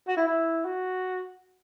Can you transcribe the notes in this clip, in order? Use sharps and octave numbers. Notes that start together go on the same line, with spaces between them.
F#4
E4
E4
F#4